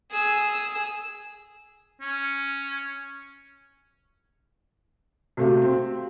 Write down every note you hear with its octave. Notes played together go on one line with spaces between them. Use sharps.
G#4 E6
C#4
C3 A3 F#4 G4 F5
C4